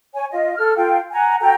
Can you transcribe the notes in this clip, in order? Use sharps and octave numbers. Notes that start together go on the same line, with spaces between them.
C#5 G#5
F4 D#5
A4 F6
F4 A4 F5 G5
F#5 G#5 A#5
F#4 A4 G5 A#5